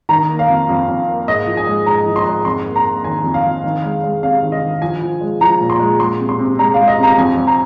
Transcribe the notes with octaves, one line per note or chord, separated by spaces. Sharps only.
D#3 A#5
A#3
F5
F2
F2
F2
A#3
G#2 D#5
F3
G#5
G#3
G#2 A#5
F3
C6
G#2
F2 C6
A#3
A#5
A#3
D#3 G#5
F2
F5
F2
D#3
G#3
G#3
C3 F5
D#3
D#5
D#3
F3 G#5
F3
G#3
F3 A#5
A#2
C6
G#3
G#3 C6
C3
C6
C3
G#3 A#5
G#3 F5
D#5
C3 A#5
F2 G#5
F2
A#5